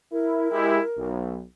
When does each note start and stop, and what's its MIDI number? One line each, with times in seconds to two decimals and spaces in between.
0.12 0.48 64
0.12 1.08 70
0.51 0.79 56
0.51 0.79 64
0.51 0.79 67
0.96 1.41 35